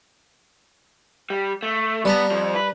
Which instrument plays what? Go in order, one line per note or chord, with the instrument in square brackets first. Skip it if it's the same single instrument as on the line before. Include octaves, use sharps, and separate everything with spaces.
[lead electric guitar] G3
A3
[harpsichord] G3 A5 A#5 [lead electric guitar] B3
[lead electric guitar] F2 F3
B4